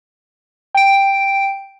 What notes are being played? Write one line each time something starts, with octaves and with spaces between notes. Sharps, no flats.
G5 D7